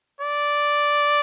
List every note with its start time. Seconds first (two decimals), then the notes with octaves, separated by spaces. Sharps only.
0.21 D5